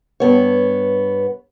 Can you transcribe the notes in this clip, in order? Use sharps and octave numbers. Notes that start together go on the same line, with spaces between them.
G2 B3 C#5